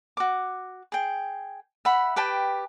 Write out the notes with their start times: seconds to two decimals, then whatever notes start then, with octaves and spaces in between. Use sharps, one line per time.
0.17 F#4 D6
0.92 G#4 G5
1.85 E5 F#5 B5
2.16 G4 B4 G5 A5